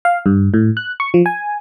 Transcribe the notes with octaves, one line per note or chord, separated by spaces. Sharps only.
F5
G2
A2
F#6
C#6
F3
G#5